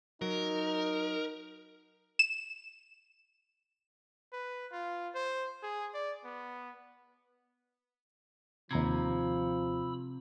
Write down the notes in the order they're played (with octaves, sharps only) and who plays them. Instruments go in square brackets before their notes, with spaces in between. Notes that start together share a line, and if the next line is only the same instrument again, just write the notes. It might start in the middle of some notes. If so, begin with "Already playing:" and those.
[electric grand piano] F#3 [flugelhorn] D#4 [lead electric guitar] A#4
[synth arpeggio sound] E7
[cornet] B4
F4
C5
G#4
D5
B3
[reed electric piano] D#2 A#5 G#6 [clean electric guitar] C3 [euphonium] F3 [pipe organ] B5 E6